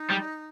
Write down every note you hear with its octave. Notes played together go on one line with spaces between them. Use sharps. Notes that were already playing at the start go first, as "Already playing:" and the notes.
Already playing: D#4
G3